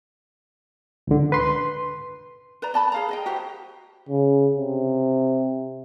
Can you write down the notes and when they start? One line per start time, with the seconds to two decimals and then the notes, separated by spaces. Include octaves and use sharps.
1.07 C#2 D3
1.32 B4 C6
2.62 B4 D5 A#5
2.74 D5 A5 B5
2.92 G#4 F5 A#5
3.09 G#4 D#5 G5
3.26 F#4 G4 C5
4.09 C#3
4.56 C3